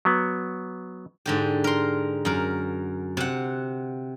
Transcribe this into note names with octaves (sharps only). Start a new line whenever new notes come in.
F#3 B3
G#2 D3 G4
A#4 C6
F#2 A#4
C3 F#5